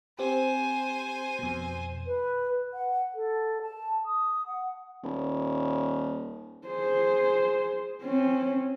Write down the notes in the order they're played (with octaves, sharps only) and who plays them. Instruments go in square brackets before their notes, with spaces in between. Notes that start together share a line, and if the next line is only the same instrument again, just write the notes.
[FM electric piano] C4 G4 [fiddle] C5 G#5
[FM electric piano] F2 B2
[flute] B4
F#5
A4
A5
D#6
F#5
[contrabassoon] D#1
[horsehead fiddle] G#4 C5
C4 C#4